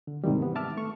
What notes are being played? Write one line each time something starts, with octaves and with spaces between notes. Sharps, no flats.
D3
G#2 C3 D#3 E3 G3
B3
E5 A5 D6 F6
A3 C#6